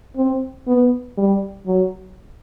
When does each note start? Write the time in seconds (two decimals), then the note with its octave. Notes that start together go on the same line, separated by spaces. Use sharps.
0.16 C4
0.67 B3
1.18 G3
1.67 F#3